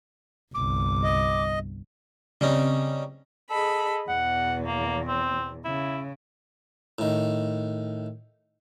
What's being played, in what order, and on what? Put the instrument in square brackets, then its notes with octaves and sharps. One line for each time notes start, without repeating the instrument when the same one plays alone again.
[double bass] G1 C2 [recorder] D6
[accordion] D#5
[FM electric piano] C#3 C4 [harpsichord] G3 C#4 D#4
[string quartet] G#4 D#5 B5 [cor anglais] A4
[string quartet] E2 B2 [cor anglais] F#5
[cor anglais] A#3
C4
[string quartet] C#3 [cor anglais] E4
[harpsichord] A2 D#3